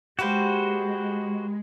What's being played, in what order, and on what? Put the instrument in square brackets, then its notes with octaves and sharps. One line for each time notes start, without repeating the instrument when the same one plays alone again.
[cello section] G#3 [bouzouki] A#3 G4 B4 [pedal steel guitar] F#4 C5